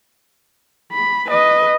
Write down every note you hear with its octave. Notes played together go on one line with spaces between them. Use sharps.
B5
B4 D#5